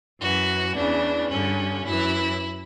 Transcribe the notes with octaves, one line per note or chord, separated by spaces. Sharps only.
F#2 E3 F#4
E2 C#3 E3 D4
G2 D3 C#4
F#2 E3 E4